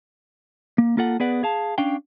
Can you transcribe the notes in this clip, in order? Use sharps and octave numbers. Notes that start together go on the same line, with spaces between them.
A#3
A#3 F4 A4 F#5
B3 G#4 B4 D5 F#5
G#4 F5 A5
C#4 D4 F5 G5